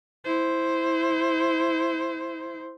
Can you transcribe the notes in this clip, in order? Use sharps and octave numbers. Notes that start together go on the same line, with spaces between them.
E4 C5